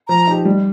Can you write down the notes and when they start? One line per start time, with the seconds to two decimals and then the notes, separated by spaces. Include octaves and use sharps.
0.08 F3 A#5
0.27 D#4 G4
0.45 G3